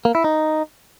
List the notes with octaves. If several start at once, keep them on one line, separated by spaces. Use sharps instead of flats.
A#3
E4
D#4